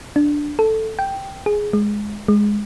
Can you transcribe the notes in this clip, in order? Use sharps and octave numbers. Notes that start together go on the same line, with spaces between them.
D4
A4
G5
G#4
G#3
G#3